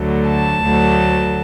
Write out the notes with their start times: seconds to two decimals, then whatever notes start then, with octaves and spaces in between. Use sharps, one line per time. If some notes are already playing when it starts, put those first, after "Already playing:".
Already playing: D2 D3 F#3 A3
0.28 A5
0.62 D2 D3 F#3 A3